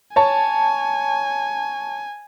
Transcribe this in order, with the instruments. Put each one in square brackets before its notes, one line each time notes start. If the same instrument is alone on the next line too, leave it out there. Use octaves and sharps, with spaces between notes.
[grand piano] C#5 A5 [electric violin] G#5